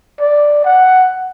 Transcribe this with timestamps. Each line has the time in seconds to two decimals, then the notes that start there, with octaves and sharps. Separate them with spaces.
0.20 D5
0.65 F#5